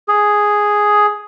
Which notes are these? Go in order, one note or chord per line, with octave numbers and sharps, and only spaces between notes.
G#4